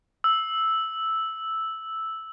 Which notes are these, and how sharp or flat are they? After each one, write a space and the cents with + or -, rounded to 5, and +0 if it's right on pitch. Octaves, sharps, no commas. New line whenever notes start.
E6 -5